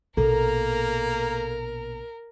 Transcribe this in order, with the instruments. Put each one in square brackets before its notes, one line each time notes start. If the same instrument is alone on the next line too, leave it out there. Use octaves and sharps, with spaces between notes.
[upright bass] A#1 B2 [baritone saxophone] A#3 [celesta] A4 [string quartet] A#4